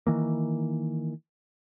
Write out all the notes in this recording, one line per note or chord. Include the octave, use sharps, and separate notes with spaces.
D#3 E3 A#3